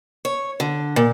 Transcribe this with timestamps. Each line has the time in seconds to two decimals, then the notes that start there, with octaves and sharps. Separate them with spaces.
0.25 C#5
0.60 D3
0.96 A#2